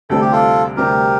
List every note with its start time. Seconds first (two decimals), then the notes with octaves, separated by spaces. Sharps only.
0.10 D2 C3 G3 C4 A4
0.21 G4
0.32 F4 A4
0.76 D2 C3 G3 C4 G4 A#4